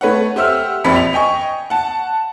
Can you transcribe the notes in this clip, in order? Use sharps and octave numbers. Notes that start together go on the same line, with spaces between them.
A3 B4 C#5 F#5
G4 C5 E5 F#5 E6 F6
A#1 F2 B5 B6 C#7
F7
D#5 G5 G#5 C#6
F#5 A5